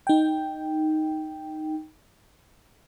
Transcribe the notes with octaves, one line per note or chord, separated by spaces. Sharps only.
D#4 G5